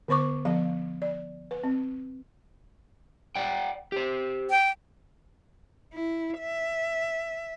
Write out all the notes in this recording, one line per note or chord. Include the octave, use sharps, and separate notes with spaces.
D3 B3 C5 C#6 D6
F3 B3 F5
D5
B4
C4
D5 F#5 G5
G4 C5
G5
E4
E5